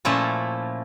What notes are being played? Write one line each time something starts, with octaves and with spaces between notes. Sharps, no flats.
A#2 F3 A3 C#4 E4 A4